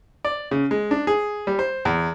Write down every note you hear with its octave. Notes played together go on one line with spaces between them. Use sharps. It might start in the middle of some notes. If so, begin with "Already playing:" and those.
D5
C#3
G#3
D4
G#4
G3
C5
E2